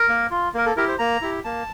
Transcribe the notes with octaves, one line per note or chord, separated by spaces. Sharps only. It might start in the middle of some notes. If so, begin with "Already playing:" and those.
Already playing: A#4
A#3
F4
A#3 A#4
A4
E4 G4 A#4
C5
A#3 A#5
E4 G4
A#3 A5